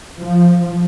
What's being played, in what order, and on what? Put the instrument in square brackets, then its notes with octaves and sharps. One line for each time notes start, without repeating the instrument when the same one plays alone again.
[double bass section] F3